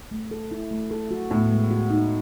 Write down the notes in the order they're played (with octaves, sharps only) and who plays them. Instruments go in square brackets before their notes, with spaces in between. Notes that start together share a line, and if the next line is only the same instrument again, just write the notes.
[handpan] A3
A4
E4
A3
A4
F#4
[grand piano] A2 [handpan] B3
[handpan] G#3
F#4
D#4